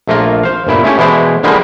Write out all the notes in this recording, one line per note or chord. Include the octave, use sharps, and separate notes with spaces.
A#1 A3 A#3 F4 A#5
C5 F5
G1 A#2 E4
A3 C#4 G4
B2 E3 G#3 E4 C5 D5
D3 F3 G3 G#3 A#3 E4